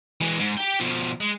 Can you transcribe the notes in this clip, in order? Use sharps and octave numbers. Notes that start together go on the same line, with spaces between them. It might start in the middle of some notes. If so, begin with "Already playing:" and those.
E3 G#3
G#2
G4 G5
B2 F3
G#3